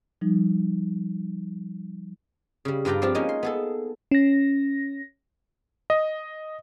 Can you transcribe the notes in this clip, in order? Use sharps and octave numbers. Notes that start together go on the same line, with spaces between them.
F3 G3 D#4
C#3 G3
G2 F4 B4 D5 G5 A#5
F3 C4 D4 F4 G4
G#3 A#3 C#4 D#4
C6
B3 G#4 A4
C#4 A#6
D#5